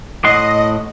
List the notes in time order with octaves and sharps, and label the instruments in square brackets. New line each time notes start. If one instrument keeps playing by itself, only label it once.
[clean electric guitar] A2 F#5 C6 [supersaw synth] D#5